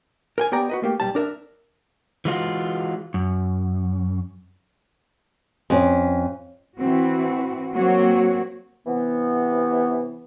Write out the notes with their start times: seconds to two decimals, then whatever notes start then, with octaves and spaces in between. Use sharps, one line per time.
0.38 A#4 G5 G#5
0.52 B3 G4 D5 A#5
0.69 F#4 B4 D#5
0.82 A3 A#3 G4
1.00 B1 G3 A5
1.15 D4 A#4 E5
2.25 E3 G#3 F4 F#4
3.14 F#2
5.70 F2 C#4
6.78 E3 C4 F#4
7.74 F#3 A#3 C4 F#4 C#5
8.87 C3 E3 B3